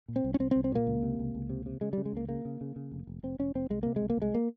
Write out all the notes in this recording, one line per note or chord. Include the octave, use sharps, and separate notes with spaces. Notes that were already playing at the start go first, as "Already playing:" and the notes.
A#2
C4
C2
C#4
C2 C4
C4
C2
C4
A#2 A#3
C#2
C3
C#2
C#2
C3
C3
C#3 G#3
C#3 G3
G#3
C#2 A#3
C#3 A#3
C#3
C#3
C#3
F1
F1
F1 C4
F1 C#4
F1 C4
C2 G#3
C3 A#3
G#3
C2
A#3
C2 G#3
A#3